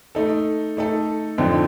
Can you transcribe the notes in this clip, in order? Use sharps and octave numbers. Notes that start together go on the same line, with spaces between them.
A3 D#4 A4
A3 D#4 A4
F2 D3 F3 C4 D#4